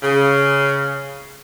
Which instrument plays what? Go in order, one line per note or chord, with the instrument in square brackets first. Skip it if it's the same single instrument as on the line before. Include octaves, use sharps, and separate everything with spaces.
[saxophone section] C#3